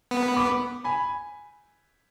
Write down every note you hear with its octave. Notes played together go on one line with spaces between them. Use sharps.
B3
B5 D6
G#5 B5